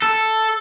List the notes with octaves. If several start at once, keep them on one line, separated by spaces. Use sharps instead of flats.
A4